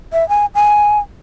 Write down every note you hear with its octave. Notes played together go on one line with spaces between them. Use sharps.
E5
G#5
G#5